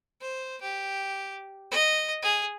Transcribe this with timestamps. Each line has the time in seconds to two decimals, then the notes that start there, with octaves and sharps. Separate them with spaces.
0.21 C5
0.61 G4
1.71 D#5
2.22 G#4